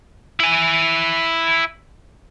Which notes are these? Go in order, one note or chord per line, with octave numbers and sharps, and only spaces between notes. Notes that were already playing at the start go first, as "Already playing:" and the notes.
E4 G#5